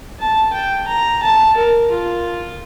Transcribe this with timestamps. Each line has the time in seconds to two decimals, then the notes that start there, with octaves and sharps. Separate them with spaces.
0.20 A5
0.53 G5
0.88 A#5
1.23 A5
1.57 A#4
1.91 F4